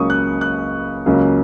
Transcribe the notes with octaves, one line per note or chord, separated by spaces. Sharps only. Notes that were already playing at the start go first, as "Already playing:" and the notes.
Already playing: C#2 C#3 F#3 A#3 C#6 D#6
F#6
F#6
C#2 C#3 F#3 A#3